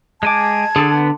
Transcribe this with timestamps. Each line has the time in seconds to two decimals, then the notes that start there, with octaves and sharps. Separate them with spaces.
0.23 G#3 G#5 A5 D6 G#6
0.76 D3 G#4 A4
0.92 B3